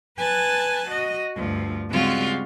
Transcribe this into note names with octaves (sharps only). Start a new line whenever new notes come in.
B4 G#5 A5 F#6 A6
F#4 D#5
D2 G2 F3
C#3 G3 G#3 C4 F4 F#4